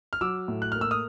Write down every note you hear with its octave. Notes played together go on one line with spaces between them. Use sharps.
F6
F#3 D6 E6
A2
F#6
A#3 F6
E6
D#6 F6